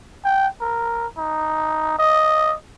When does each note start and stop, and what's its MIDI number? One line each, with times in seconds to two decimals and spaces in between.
0.25 0.48 79
0.61 1.07 70
1.18 1.99 63
1.99 2.56 75